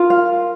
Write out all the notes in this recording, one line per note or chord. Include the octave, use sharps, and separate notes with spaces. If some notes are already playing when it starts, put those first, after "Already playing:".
Already playing: F4 A#4
F5